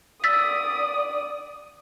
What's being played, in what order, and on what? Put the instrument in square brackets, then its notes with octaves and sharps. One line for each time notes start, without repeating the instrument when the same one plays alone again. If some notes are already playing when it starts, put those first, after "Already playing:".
[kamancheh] D5 D#6 [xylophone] E6 A6 B6